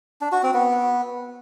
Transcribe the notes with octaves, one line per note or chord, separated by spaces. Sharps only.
D4
F#4
C4
B3